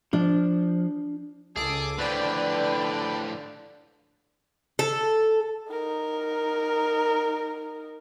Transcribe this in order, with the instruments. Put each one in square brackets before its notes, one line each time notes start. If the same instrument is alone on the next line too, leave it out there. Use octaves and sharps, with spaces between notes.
[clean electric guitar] F3 [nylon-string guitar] D4
[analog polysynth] C#2 D6 [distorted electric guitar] G#4 [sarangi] A4
[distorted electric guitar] A2 F3 [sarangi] D3 [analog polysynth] B4 D5 G5
[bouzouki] A4
[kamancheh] D#4 A#4